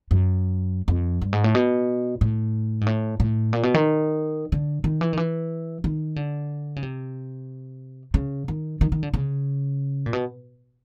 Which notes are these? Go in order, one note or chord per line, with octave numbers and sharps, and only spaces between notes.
F#2
F2
G2
G#2
A2
B2
A2
G#2
A2
A2
A#2
B2
D#3
D3
D#3
E3
D#3
E3
D#3
D3
C#3
C3
C#3
D#3
D#3
D#3
D3
C#3
A#2
B2